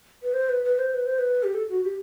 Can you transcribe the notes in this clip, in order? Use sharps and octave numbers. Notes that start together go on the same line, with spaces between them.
B4
C5
B4
B4
C5
B4
C5
B4
G4
A4
F#4
G4